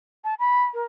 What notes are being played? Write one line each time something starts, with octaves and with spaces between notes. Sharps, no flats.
A5
B5
A#4